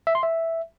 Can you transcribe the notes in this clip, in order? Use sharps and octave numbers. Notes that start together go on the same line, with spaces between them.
E5
C6
E5